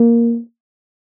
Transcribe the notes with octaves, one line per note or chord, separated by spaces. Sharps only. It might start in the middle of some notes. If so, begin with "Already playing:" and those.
Already playing: A#3